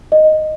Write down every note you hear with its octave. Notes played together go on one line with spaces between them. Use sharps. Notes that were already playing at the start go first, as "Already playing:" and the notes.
D#5